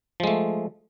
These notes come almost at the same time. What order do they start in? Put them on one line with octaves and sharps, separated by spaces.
F3 G#3 A3